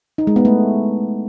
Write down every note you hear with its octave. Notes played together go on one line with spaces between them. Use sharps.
D#4
G#3
B3
A3